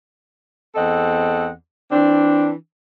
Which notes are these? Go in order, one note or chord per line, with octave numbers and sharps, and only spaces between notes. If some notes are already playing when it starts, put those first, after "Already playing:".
E2 C4 A4 D#5 F#5
E3 C4 D4